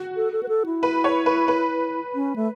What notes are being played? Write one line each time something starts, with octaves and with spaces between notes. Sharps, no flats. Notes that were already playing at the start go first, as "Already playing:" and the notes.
Already playing: F#4
A4
A4
B4
A4
E4
B4
C#5
B4
B4
C#4
A3